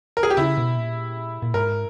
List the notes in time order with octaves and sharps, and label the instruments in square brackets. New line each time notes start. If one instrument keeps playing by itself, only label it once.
[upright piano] A#4
G#4
G4
[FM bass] C#3 [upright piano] E4
[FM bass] B2
A#2
A#2
[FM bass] G#2 [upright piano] A#4